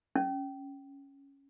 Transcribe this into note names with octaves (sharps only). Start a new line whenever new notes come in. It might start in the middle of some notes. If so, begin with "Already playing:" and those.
C#4